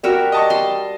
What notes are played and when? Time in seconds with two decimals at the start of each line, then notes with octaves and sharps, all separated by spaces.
0.04 G3 F#4 A#4 E5
0.32 D#5 A5 C#6
0.50 C6